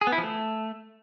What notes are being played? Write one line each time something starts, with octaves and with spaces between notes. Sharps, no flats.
G#4
B3
E4
F3
A3